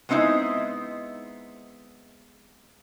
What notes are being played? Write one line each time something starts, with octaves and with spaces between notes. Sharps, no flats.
G#3 B3 C4 D#4 E4